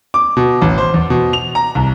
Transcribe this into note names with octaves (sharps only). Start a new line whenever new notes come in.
D6
B2
A1
C5
E2
B2
F7
A#5
C2